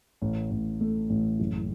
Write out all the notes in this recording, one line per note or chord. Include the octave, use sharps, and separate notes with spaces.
A1
A1
A3
A1
F#1